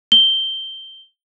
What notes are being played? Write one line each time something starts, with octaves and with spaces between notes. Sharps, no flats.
G7